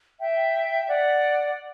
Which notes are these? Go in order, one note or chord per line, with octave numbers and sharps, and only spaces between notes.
E5 G5
D5 F#5